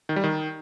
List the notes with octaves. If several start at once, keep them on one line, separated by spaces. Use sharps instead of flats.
D#3
G3
D#3